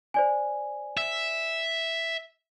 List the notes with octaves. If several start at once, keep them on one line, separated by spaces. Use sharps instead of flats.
C5 D5 G#5
E5